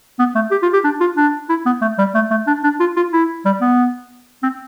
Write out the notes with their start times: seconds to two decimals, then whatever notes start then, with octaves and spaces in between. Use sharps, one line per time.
0.19 B3
0.35 A3
0.51 G4
0.62 F4
0.73 G4
0.84 D4
1.00 F4
1.17 D4
1.49 E4
1.66 B3
1.82 A3
1.98 G3
2.15 A3
2.31 A3
2.47 D4
2.64 D4
2.80 F4
2.96 F4
3.13 E4
3.45 G3
3.61 B3
4.43 C4